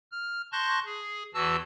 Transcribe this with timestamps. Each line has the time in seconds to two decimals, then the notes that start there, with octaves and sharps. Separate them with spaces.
0.12 F6
0.52 A5 C6 C#6 F#6 G6 A#6
0.85 G#4
1.34 E2 E3 F#4 A5 E6